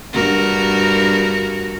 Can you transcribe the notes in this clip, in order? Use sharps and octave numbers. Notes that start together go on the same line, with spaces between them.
G2 F#4 A#4